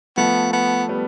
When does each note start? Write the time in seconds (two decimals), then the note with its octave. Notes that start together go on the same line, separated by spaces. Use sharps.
0.17 F3 A3 B3
0.53 B3
0.88 G3 B3